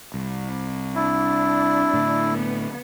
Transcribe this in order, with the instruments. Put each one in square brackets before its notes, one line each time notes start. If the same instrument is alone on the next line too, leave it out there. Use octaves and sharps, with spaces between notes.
[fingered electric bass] C2
[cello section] D4 [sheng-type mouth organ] E4
[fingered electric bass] A2 D3
[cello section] B3